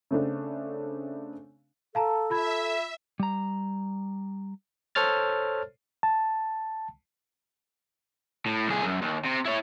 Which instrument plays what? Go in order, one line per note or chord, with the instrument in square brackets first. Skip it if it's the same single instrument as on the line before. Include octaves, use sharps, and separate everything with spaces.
[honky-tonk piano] C#3 A3 C4 D4
[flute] A4 [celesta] F5 A5 A#5
[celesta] F4 B5 G#6 [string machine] E5
[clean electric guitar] G3 A#5
[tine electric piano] A4 C5 C#5 F6 A6
A5
[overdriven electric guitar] A2
C2 G#4
F#2
D#2
C3
E4 C#5